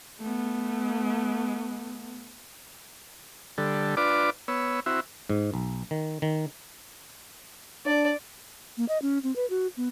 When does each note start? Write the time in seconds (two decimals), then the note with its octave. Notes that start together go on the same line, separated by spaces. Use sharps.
0.21 A3 B3
3.58 D3 G3 A4
3.97 D4 F4 B4 D5 D6
4.48 B3 C#5 E6
4.86 C4 E4 F#4 E5
5.30 G#2
5.54 B1
5.91 D#3
6.22 D#3
7.86 D4 D5
8.77 A#3
8.89 D#5
9.02 C#4
9.23 C4
9.36 B4
9.50 F#4
9.77 B3